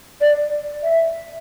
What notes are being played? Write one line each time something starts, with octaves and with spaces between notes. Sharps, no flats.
D5
E5